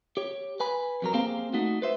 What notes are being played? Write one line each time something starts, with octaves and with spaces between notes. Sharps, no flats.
G4 C#5
B4 G#5 B5
F2 F#3 A#4
A#3 C4 G4 G#4 F5
A3 D#4 F#4
B4 C5 E5